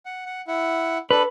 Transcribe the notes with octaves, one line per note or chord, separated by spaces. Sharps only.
F#5
F#5
E4 F#5
D4 A4 B4